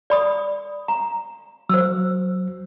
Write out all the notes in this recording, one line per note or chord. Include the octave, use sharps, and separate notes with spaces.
D5 B5 D#6
A#5
F#3 C5 E6